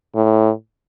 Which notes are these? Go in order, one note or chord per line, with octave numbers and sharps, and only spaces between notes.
A2